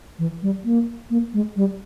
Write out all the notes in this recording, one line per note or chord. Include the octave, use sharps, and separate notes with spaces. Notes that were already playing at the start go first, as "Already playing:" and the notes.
E3
G3
A#3
A#3
G#3
G3